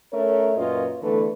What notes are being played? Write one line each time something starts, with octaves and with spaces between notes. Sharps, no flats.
A3 C#4 A#4 C#5
F#2 A#2 F4 B4 C#5 D#5
E2 D3 E3 A3 B4